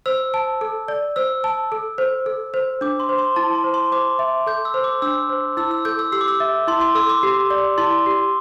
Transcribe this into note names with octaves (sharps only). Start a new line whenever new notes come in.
C5 E6
A5
A4
D5
C5 E6
A5
A4
C5
A4
C5
D4 D6
C6
C5
C6
E4 A5
C6
C5
C6
C5 D6
E5
A4 G6
E6
C5
D6
D4 E6
C5
E4 E6
E6
A4 G6
E6
G4 E6
D6
E6
E5
E4 C6
C6
A4 E6
D6
G4
D5
E4 C6
G4